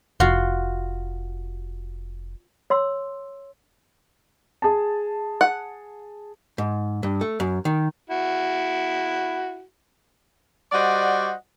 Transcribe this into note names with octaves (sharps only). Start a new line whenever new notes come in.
F1 F4 F#4
C#5 C6 E6
G#4 A5
F#5
G#2
G2
A3
F#2
D#3
E4 F#4
G3 F#4 C5 D5 D#5 F#5